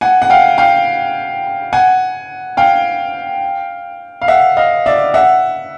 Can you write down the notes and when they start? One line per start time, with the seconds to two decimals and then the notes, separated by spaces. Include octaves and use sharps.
0.01 F#5 G#5
0.22 F#5
0.30 F5 G5
0.58 F5 G5
1.73 F#5 G#5
2.57 F5 G5
4.21 F5
4.28 E5 F#5
4.57 D#5 F5
4.86 D5 E5
5.14 E5 F#5